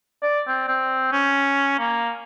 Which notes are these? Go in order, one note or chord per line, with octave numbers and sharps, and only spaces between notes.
D5
C4
C4
C#4
A#3